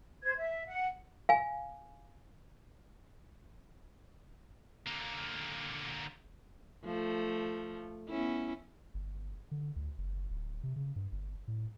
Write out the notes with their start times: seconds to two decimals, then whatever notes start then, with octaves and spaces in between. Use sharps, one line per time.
0.23 C5 G#6
0.38 E5
0.67 F#5
1.29 F5 G#5
4.86 D3 A#3
6.85 F3 A3
8.09 B3 C#4 E4
8.94 G1
9.51 D3
9.76 D2
9.98 F#1
10.30 D1
10.63 C3
10.76 C#3
10.96 G2
11.12 G1
11.48 A2